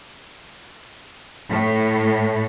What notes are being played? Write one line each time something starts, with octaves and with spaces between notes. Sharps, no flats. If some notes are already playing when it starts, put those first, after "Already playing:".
A2